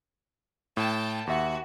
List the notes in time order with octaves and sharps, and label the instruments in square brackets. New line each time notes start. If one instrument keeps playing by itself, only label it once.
[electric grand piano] A2 [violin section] G5 A5
[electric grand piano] D#2 E5 [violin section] F#4